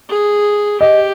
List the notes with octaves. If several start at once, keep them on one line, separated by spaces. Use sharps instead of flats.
G#4
G4 D#5